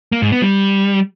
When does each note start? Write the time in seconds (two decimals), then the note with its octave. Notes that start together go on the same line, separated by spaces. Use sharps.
0.12 A#3
0.22 G#2
0.32 B3
0.42 G3